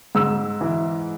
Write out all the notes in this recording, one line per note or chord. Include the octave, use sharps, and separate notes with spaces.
G#2 E6
E3